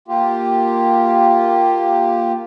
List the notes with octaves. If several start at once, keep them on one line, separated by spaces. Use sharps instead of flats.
A#3 F4 G4